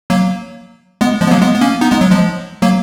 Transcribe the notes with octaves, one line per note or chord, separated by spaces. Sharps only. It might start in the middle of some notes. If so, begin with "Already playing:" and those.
F#3 A#3
G#3 B3
F3 G#3
B3
F#3 A#3
G#3 B3
B3
A#3 C#4
B3 D#4
G#3 B3
F#3
F3 G#3
F#3 A#3